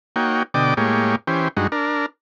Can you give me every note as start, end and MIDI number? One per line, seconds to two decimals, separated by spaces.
0.16 0.43 58
0.16 0.43 63
0.16 0.43 66
0.16 0.43 73
0.16 0.43 79
0.54 0.74 47
0.54 0.74 50
0.54 0.74 74
0.54 0.74 75
0.54 0.74 79
0.54 0.74 86
0.77 1.16 45
0.77 1.16 56
0.77 1.16 58
0.77 1.16 67
0.77 1.16 73
1.27 1.48 52
1.27 1.48 61
1.27 1.48 67
1.27 1.48 72
1.57 1.67 43
1.57 1.67 56
1.57 1.67 63
1.57 1.67 66
1.72 2.06 62
1.72 2.06 70